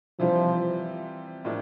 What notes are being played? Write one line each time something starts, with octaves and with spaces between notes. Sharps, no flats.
C3 E3 F3 G3
A2 F3 A#3 D4